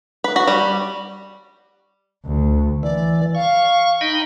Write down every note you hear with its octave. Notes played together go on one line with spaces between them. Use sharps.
B4
F#4
G3
D2
E3 D5
F5 C#6
D#4 D#5 G5 B5